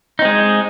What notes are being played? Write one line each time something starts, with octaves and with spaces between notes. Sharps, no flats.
G#3 C4 D#4